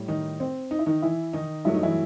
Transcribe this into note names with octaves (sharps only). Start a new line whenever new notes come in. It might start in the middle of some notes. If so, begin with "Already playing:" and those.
Already playing: A2 G3
D#3 D#4
C4
D#4
E4
D#3 D#4
E3 E4
D#3 D#4
G2 F#3 A3 E4
D#4
E3 E4